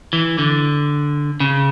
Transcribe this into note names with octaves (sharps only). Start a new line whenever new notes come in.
E3
D3
C#3